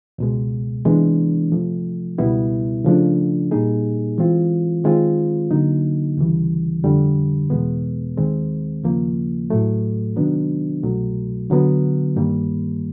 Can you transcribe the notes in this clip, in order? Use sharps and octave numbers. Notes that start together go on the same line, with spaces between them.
C#2 B2 G#3
C3 E3 G#3 B3 D4
C3 F3 A3
C#2 B2 G3 B3 E4
C#3 F3 A3 D4
A#2 G3 A#3 D#4 G#4
E3 G#3 C4 F4
D#3 G#3 C4 F4
D3 F#3 A#3 D#4
D2 C#3 E3 G3
F2 D3 G3
E2 B2 G#3 B3
D#2 D#3 G#3 C4
D#2 C#3 F3 A#3
A2 F#3 A3
C3 D#3 F#3 B3 D4
C2 B2 F#3 A3
D3 F#3 B3
G2 D#3 G3 A#3